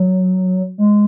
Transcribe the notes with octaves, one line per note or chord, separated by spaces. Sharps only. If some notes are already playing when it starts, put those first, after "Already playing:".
Already playing: F#3
G#3